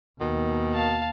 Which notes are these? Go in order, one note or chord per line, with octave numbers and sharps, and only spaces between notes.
D#2 B2 D#3
F5 A5